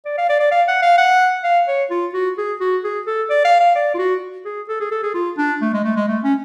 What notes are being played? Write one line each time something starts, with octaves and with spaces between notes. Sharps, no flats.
D5
F5
D5
D5
F5
F#5
F5
F#5
F5
C#5
F4
F#4
G#4
F#4
G#4
A4
D5
F5
F5
D5
F4
F#4
G#4
A4
G#4
A4
G#4
F4
D4
A3
G#3
A3
G#3
A3
C#4